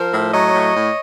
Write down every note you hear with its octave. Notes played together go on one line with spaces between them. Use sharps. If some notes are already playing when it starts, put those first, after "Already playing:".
Already playing: F3 A#4 C5
A2
F#3 C#5 D#5
A2
A2